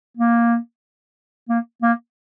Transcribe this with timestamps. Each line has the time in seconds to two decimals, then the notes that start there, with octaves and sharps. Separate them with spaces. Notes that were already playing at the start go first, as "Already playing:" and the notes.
0.17 A#3
1.49 A#3
1.82 A#3